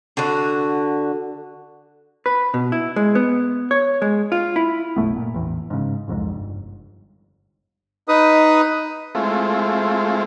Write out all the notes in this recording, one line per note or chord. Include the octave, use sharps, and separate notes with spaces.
D3 F#4
B4
B2
E4
G#3
B3
C#5
G#3
F4
E4
F#1 B1 A3 B3
A#2
A1 E2
G#2 C#3
F#1 C2 F2 G#2
G1
D#4 B4 D#6
G#3 A3 C4 E4 F4